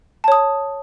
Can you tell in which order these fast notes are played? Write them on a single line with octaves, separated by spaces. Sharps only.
A5 C#5 D#6